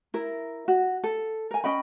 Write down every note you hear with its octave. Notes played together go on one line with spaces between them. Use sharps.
E4 A#4
F#4
A4
A#4 G#5
C#4 D#5 G5 B5